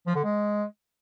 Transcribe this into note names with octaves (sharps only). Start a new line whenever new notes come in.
F3
D3
G#3